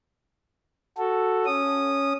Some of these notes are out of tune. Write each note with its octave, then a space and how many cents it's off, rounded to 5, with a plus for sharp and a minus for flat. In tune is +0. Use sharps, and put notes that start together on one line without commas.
F#4 +0 A4 +0
C#4 +0 D#6 -10